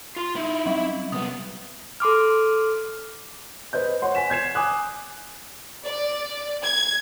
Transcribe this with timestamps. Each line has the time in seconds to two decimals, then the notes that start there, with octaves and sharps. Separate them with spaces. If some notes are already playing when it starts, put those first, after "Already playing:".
0.16 F4 C6
0.36 D#4 E4
0.66 F#3 G3
1.12 C2 B3 D#6
2.00 A4 C6 D6 F6
3.73 B4 C5 D#5 G6
4.02 C#5 F#5 C6
4.15 G#5 B6 E7
4.30 G6 G#6 C7 E7
4.55 G#5 D6 D#6 F#6
5.84 D5
6.63 G#6